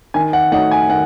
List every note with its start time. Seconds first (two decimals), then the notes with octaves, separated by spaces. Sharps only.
0.14 D#3 G#5
0.33 F#5
0.52 A3 D#4 F#4 C#5 F#5
0.71 G#5
0.90 D#3 F#5